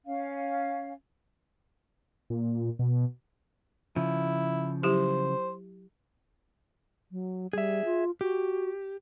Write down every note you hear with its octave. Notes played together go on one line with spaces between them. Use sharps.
C#4 F5
A#2
B2
C#3 F3 E4
F#3 E4 G4 C5
F#3
G3 G#4 E5
F4
F#4 G4